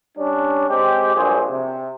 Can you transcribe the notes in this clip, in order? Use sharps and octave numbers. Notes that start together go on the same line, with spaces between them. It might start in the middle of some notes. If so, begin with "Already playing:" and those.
G3 C#4 D4
G#3 C4 G4
A#1 G2 F#3 G#4 C5
C3